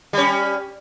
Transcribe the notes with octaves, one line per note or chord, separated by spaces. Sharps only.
G3 C#4